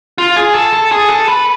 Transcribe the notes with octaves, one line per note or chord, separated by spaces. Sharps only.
F4
G#4
A4
A4
G#4
A4
B4